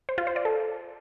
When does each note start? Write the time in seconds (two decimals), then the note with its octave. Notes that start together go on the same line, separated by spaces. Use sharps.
0.09 C5
0.18 F4
0.27 C5
0.36 D5
0.45 A4